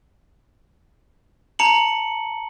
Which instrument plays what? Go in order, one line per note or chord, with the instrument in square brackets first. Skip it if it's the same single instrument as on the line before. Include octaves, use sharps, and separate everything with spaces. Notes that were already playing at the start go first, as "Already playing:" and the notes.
[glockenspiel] A5 A#5 C#7 F#7